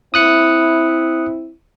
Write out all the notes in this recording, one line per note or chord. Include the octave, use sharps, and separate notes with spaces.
C4 E4 D#6 F#6 C#7